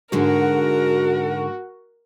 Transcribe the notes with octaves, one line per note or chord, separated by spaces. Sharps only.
G#2 D3 G#3 F#4 A#4